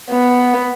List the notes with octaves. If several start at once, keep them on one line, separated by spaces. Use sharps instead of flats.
B3